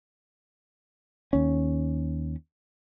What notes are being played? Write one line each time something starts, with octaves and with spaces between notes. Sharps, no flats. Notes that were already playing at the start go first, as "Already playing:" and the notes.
D#2 C#4